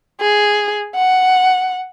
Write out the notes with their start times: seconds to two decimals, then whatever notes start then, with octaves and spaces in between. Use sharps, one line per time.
0.21 G#4
0.96 F#5